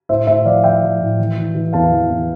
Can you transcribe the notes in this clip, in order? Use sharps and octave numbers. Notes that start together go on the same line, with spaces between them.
A2 C5 E5
A2 C5 E5
F3 D5 F5
F3 E5 G5
F3
A2
E3
E3
E3
E2 F5 A5
E3
E2